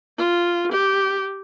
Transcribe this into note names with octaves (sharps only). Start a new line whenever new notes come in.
F4
G4